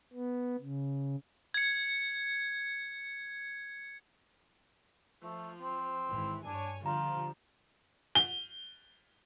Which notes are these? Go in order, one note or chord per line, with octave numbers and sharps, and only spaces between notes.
B3
C#3
G#6 C#7
F3 A3
C4
G#1 E3 E4
G2 D4 C#5 G#5
D3 F3 G3 F4 A#5
G7